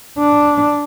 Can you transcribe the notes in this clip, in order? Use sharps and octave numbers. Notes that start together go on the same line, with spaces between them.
D4